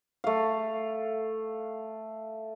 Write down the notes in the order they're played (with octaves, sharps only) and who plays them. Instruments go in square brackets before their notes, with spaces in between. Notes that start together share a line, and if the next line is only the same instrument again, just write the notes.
[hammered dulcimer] A3 F5